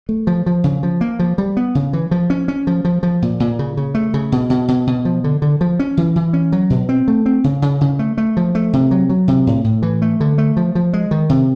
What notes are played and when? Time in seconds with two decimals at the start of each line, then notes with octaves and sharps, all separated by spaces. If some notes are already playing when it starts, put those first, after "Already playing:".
0.09 A3
0.27 F3
0.46 F3
0.64 C#3
0.83 F3
1.01 A#3
1.19 F3
1.38 G3
1.57 B3
1.75 C#3
1.93 E3
2.11 F3
2.30 C#4
2.48 C#4
2.67 F3
2.85 F3
3.03 F3
3.22 A#2
3.40 A#2
3.59 C#3
3.77 C#3
3.95 A3
4.14 C#3
4.32 B2
4.50 B2
4.68 B2
4.87 B2
5.05 F3
5.24 D3
5.42 D3
5.61 F3
5.79 C#4
5.97 E3
6.16 E3
6.33 C#4
6.52 F#3
6.70 B2
6.89 C4
7.08 A3
7.26 C4
7.44 C#3
7.62 C#3
7.81 C#3
7.99 A3
8.18 A3
8.37 F3
8.55 A3
8.73 C3
8.91 F#3
9.09 F#3
9.28 C3
9.47 A2
9.64 A2
9.82 E3
10.02 A3
10.20 D3
10.38 A3
10.57 F3
10.75 F3
10.93 G#3
11.11 D#3
11.29 C3